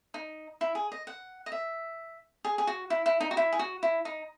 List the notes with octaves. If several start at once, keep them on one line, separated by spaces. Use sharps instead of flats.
D#4
E4
G#4
D#5
F#5
D#5
E5
G#4
G#4
F#4
E4
E4
D#4
F#4
E4
G#4
F#4
E4
D#4